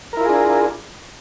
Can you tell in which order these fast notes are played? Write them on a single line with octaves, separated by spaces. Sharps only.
A#4 E4 F4 G#4 D4